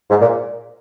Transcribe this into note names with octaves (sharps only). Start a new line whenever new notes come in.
G#2
A#2